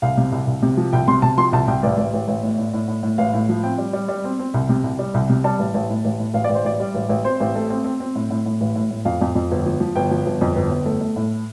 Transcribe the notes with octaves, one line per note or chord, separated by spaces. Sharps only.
C2 F5
C3
C2
C2
C3
F3
C2 G5
C3 C6
C3 A5
F3 C6
C2 A5
C2 G5
A1 D5
A1
A1
A1
A2
A2
A2
A2
A2
A1 F5
A2
F3
C4 G5
G3
G3
G3
C4
C4
C2
C3
C2
G3
C2
C3
G3 A5
A1
A1
A2
A1
A2
A1 F5
D5
A1
C5
A1 D5
G3
A1
A1
C4 C5
A1
A3
C4
C4
C4
A2
A2
A2
A1
A2
A2
F2 F5
F2
F2
G1
F3
F3
G1 G5
F3
G1
F2
G1
G1
A3
A3
A2